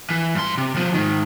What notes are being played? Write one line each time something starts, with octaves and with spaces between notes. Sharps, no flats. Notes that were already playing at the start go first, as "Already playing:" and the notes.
E3
G2 C6
C3
D#2 F3
G#2 D#3